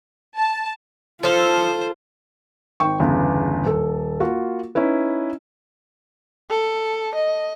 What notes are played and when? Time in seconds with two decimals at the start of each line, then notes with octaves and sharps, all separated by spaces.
0.37 A5
1.23 F3 F4 A4 C5 F5
2.80 G#1 G5 C#6
3.00 G1 E2 C#3
3.66 D#1 A4
4.20 A#3 F4 F#4
4.75 C#4 D#4 E4 B4
6.50 A4
7.15 D#5